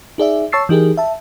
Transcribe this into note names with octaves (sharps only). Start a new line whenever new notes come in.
D#4 G#4 D5 E5
C#5 A5 C#6 E6 A6 C7
E3 D#4 G4 G#4 A#4
E5 A5